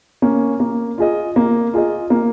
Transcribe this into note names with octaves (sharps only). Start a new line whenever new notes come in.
A#3 C#4
A#3
F4 G#4 D#5
A#3
F4 G#4 D#5
A#3